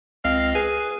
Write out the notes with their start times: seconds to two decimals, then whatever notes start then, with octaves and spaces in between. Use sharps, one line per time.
0.24 C#2 C4 D#5 F5
0.55 G#4 B4